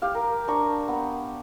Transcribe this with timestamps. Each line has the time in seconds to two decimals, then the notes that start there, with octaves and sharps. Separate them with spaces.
0.02 G4 F5
0.15 A#4
0.48 D4 A#5 C#6
0.88 B3